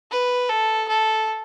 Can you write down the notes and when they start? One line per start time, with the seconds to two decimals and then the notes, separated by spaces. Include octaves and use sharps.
0.11 B4
0.49 A4
0.88 A4